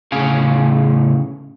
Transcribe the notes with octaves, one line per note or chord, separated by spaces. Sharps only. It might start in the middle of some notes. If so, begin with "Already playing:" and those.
A2 C#3 C#4 G#4 F5 G#5